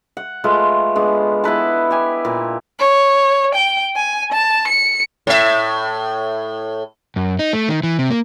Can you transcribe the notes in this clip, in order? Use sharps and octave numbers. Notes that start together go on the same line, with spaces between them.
F#5
G#3 A3 F4 B4
G#3 B3 D4
B3 E4 B4 A5
G4 G#5
A#2
C#5
G5
G#5
A5
C#7
A2 E5
F#2
D#4
A3
D#3
E3
C3
A#3